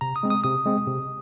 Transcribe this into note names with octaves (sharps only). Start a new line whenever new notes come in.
C3 A#5
D#6
G#3 C4
D#6
C3 D#6
G#3 C4
C3